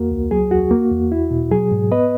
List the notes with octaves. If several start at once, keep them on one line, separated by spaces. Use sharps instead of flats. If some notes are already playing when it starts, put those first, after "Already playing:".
Already playing: E2 A#3 F#4 A#4
C#2
F#3 G#4
E2 F#4
A#3
E2
E4
B2
F#3 G#4
G#2
B3 B4 D#5